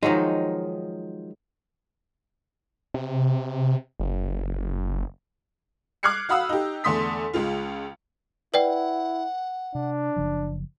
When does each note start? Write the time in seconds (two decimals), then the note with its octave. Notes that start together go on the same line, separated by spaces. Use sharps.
0.03 D#3 F3 F#3 G#3 D#4
2.94 C3
4.00 F#1
6.03 D6 F6 F#6 G#6 C7 C#7
6.29 F#4 F5 F#5 B5 D#6 E6
6.49 D#4 G4
6.84 E2 D3 A3 C6 D#6 B6
7.34 C#2 G#3 F4
8.54 E4 B4 D5 F#5 G5
9.75 C3 D4
10.16 F#1 C#3 F3